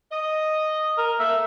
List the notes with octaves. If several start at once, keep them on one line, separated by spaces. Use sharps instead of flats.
D#5
A#4
A3 A#3 E5